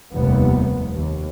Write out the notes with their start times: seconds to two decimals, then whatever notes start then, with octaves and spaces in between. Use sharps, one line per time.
0.14 F1 D#2 C3 G3 B3
0.95 D#2